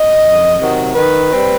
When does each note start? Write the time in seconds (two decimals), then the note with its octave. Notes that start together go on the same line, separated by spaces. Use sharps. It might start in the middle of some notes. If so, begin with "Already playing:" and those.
Already playing: D#5
0.23 F2
0.59 C3 D#3 F#3
0.95 D#3 B4
1.32 G3 C4